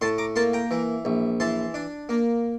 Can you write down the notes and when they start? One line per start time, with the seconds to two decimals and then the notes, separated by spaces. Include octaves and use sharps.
0.01 A2 A5 C6
0.18 A#5 D6
0.36 A#3 A5 C6
0.53 G5 A#5
0.71 E3
1.05 A#1
1.40 E3 A5 C6
1.74 D4
2.09 A#3